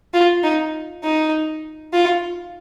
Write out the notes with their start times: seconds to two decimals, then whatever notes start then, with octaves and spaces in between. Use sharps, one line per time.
0.14 F4
0.44 D#4
1.04 D#4
1.93 F4